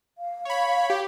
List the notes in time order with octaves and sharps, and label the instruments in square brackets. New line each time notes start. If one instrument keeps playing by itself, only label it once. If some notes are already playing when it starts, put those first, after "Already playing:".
[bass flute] F5
[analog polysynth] C#5 B5
G4